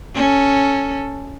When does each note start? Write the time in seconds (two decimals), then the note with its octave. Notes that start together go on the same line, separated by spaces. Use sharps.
0.15 C#4 A4